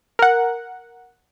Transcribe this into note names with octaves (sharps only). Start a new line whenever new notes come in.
A#4 F#5